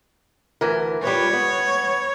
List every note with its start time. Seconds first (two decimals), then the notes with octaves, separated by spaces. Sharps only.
0.61 D2 E3 A#4
1.04 G3 F4 B4 C#5
1.33 B3